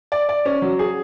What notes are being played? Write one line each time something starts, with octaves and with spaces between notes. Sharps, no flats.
D5
D5
C#4
F#3
G#4